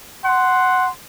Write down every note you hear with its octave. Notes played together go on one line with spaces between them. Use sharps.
F#5 C6